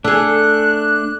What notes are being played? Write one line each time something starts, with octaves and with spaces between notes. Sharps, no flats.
A3 D4 G#4 F#6